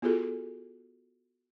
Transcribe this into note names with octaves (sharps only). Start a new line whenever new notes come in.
B3 F4 F#4 G#4 A4